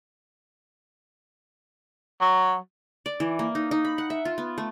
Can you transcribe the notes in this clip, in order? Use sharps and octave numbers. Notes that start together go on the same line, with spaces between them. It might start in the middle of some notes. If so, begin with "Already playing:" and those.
F#3
D5
E3
A#3
D#4
D#4
B5
F#5
E5
F4
B3
A3